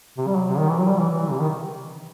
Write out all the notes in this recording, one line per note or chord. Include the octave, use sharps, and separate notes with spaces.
C3
G3
F#3
C3
D#3
E3
F#3
G3
E3
E3
C3
D#3